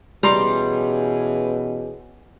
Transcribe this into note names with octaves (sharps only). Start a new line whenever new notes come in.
B2 E3 G3 C#4 G#4 A#5 C6 D6